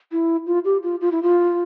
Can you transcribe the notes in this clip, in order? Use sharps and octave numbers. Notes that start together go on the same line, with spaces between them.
E4
F4
G4
F4
F4
E4
F4